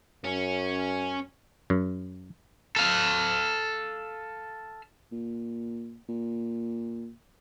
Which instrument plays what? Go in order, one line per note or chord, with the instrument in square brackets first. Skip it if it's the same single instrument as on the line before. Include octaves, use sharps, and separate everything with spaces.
[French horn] F#2 [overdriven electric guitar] C#4
[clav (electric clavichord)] F#2
[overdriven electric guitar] A4 F5
[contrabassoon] A#2
A#2